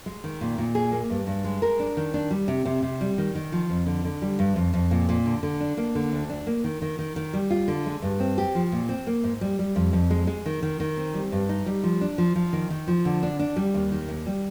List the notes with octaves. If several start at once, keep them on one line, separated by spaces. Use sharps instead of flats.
G#3
D#3
A#2
A#2
G#4
A#3
G2
G2
G#3
A#4
D4
D#3
D4
G3
C3
C3
C3
G3
D#3
D#3
F3
F2
D3
D3
G3
G2
F2
F2
A#2
A#2
D3
D3
D4
A#3
D3
D2
D4
A#3
D#3
D#3
D#3
D#3
G3
F4
D3
G#3
G2
C4
G4
F3
A#2
C4
A#3
G#2
G3
G3
F2
F2
G#3
G#3
D#3
D#3
D#3
C4
G3
G2
D#4
G3
F3
D4
F3
F3
D#3
D#3
F3
D3
D4
D4
G3
D#2
D#3
D#2
G3